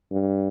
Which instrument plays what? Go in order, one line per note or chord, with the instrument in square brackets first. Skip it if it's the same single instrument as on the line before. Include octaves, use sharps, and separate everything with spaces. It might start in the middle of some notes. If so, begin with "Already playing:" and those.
[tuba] G2